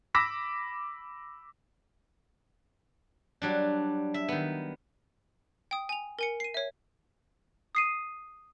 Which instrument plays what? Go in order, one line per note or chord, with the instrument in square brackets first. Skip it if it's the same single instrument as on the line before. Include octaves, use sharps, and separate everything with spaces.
[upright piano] B5 D6 E6 A#6 B6
[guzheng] F#3 G3 D4
E5
D#3 B3
[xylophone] G5 D#6
G#5 F7
A#4 G#5 C#7
C7 D#7
C#5 E5
D#6 C7 D#7